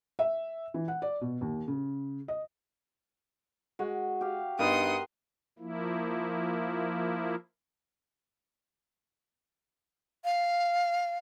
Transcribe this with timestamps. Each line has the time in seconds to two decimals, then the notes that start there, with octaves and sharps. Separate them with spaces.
0.19 E5
0.74 E3
0.88 F#5
1.02 D5
1.21 B2
1.41 D#2
1.68 C#3
2.28 D#5
3.79 G#3 F#4
4.21 G4 F5
4.59 G2 B3 D#4 A#4 F#5 C6 D#6
5.59 F3 A#3 E4
10.25 F5